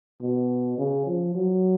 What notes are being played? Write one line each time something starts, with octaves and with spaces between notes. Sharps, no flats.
B2
C#3
F3
F#3